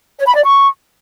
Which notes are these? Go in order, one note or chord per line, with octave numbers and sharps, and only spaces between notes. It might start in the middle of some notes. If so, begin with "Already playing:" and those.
C#5
B5
D5
C#6